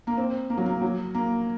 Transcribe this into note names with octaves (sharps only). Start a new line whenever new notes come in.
A#3
C4
A#3
F#3
A#3
F#3
A#3